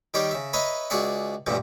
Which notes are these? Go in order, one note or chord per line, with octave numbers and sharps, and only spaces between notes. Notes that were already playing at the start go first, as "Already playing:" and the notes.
D#3 G3 G4 C#5 D5
C#3 E5
B4 C#5 D#5 E5 A#5 B5
C#2 F#4 G#4 D5 E5 F#5
A1 G2 A#2 D3 A3